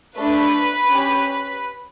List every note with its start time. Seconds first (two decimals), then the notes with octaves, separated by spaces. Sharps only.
0.18 A3 D4 A4 B4
0.90 C#4 G4